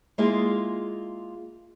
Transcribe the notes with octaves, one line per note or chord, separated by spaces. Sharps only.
G#3 A#3 E4 F4 G#4 D#5